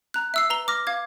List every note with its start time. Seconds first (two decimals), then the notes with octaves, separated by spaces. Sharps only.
0.14 A#5 F#6
0.34 E5 E6 C7
0.50 B4 A#5 G7
0.68 D6 F6 A#6
0.87 F5 D6 G#6